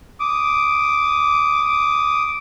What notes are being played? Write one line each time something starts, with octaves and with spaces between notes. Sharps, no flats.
D6 D#6